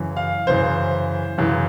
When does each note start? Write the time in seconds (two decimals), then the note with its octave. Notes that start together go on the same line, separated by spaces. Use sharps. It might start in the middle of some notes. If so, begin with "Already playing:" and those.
Already playing: F#2 C#3 E3
0.17 F5
0.47 F#2 C#3 E3 C5
1.38 F#2 C#3 E3